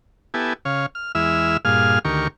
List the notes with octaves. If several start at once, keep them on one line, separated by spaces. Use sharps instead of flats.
B3 E4 G4 A4 G#5
C#3 C#5 F5
F6
E2 G#3 E4 E5 E6 F6
G2 A#2 G#4 F5 F6
D2 D#3 G4 A#4 C#6